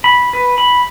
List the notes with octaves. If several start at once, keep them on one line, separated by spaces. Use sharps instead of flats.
B5
B4
B5